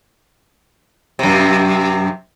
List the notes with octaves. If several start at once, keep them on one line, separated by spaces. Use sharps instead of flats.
F#2 C3